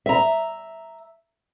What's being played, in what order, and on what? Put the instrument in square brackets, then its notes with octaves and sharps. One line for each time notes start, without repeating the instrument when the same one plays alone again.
[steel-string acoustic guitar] E5 A#5